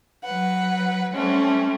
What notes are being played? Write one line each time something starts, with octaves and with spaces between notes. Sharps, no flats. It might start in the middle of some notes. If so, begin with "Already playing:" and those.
F#3 B4 F#5
G3 A3 C4 C#4